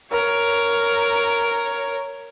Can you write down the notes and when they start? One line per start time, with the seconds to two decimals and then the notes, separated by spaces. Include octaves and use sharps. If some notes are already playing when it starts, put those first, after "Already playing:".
0.12 A#4 C#5